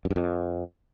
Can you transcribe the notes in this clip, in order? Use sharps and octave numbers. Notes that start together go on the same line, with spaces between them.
F#2
G2
F2